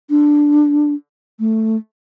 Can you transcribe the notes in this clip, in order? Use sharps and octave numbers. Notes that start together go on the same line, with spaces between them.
D4
A3